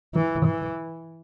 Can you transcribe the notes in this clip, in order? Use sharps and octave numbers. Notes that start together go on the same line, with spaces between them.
E3
E3